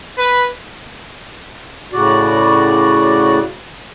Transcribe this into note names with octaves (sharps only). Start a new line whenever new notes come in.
B4
A2 C#3 F#4 D5